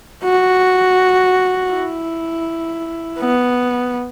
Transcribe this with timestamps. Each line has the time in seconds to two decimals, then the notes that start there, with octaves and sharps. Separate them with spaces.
0.24 F#4
1.71 E4
3.19 B3